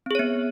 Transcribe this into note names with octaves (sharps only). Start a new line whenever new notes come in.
B3 C4 G#4 C#5